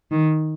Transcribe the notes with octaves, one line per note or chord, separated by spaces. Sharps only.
D#3